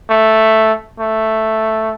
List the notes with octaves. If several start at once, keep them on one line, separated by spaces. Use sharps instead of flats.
A3
A3